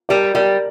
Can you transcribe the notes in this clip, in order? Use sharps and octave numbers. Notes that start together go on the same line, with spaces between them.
G3 A#4 D5
G3 A#4 D5